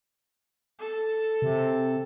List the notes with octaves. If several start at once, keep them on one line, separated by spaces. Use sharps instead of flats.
A4
C3